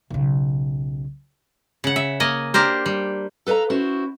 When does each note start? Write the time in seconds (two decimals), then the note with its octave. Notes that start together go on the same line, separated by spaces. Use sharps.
0.10 B1 C#3
1.84 C#3 F#5
1.96 E5
2.20 A#3 D#5 G#5
2.54 D4 G4 A#4 C5
2.86 G3
3.47 A4 B4 D#5 F5 A#5
3.70 C#4 E4 F#4 C5